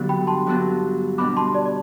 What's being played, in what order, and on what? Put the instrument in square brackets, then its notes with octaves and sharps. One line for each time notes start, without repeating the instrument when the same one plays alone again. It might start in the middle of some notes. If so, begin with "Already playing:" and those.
Already playing: [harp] G2 D3 F#3 B3 F#4
[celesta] G5 B5
A5 C6
[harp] G2 D3 F#3 B3 F#4
[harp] B2 G3 D4 F#4 [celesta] B5 D6
[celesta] A5 C6
D5
D5